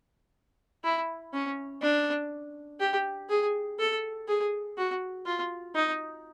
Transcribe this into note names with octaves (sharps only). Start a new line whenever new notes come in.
E4
C#4
D4
G4
G#4
A4
G#4
F#4
F4
D#4